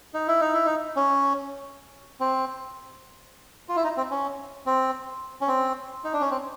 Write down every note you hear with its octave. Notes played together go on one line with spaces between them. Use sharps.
D#4
E4
D#4
E4
D#4
C#4
C4
F4
E4
D#4
C4
C#4
C4
C#4
C4
D#4
D4
C#4
C4